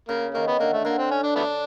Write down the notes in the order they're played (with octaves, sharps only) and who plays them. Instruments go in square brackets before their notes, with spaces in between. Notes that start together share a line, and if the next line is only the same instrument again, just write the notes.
[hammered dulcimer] C#3 [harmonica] A#3
[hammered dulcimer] D#3 [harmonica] A#3
[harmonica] B3
[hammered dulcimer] D3 [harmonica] A#3
[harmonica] A3
[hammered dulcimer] D3 [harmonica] A#3
[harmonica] C4
C#4
D4
A3 B3 D4